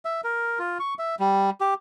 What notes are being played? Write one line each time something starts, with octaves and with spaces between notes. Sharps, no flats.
E5
A#4
F4
C#6
E5
G3
G4